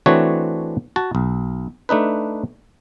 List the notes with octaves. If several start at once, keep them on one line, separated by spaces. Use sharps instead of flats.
E3 A3 C4 D4 F#4 C#5
F#4 A5
B1
A3 D4 D#4 B4